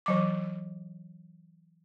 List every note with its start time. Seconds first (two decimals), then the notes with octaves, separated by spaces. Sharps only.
0.06 E3 F#3 D6